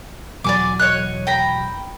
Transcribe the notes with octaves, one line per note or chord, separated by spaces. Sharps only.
E1 F#3 D5 G#5 D6
C#5 D#5 F#6
G5 A#5 B5